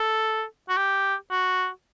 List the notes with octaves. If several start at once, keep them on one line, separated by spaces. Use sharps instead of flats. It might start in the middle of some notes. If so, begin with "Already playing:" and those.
Already playing: A4
F#4
G4
F#4